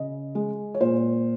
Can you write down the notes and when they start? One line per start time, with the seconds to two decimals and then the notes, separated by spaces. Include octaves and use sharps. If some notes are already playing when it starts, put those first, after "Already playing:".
Already playing: C#3 D#5
0.35 G#3
0.74 C#5
0.80 A#2 C5